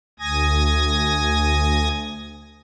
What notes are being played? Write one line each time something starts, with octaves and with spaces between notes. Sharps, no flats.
D2 G#5 D#6 G#6 A#6